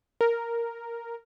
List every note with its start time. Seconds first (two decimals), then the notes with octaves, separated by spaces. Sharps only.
0.21 A#4